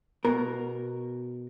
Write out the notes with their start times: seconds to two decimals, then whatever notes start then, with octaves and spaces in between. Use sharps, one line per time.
0.25 B2 A#4